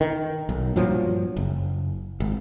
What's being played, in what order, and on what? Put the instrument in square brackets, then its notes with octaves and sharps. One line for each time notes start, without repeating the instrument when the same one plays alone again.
[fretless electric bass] D#3
B1
G2 A#2 F3 F#3
F#1
G#1